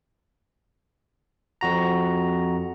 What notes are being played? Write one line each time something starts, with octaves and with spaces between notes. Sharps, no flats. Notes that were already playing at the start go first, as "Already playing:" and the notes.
F2 F#4 A#5